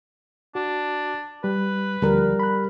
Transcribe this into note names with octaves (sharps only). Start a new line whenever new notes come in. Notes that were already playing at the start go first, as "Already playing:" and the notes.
D4 F#4
G3 B4
D2 F3 G3 A#4
B5 F#6